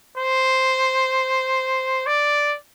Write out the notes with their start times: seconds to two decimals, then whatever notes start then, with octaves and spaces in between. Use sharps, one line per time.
0.18 C5
2.06 D5